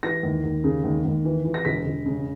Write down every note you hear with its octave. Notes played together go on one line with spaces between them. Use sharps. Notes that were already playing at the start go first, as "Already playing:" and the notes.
E3 A#6
D#2
D#2
C#3
D#2
D#2
E3
E3
A#6
E1 B6
E1
C#3